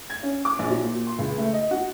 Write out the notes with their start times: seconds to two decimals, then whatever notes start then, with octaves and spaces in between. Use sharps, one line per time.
0.10 G#6
0.23 C#4
0.45 D6
0.59 A#1
0.70 F#3
0.84 A#2
1.07 C6
1.19 C#2
1.38 A3
1.53 D#5
1.71 F#4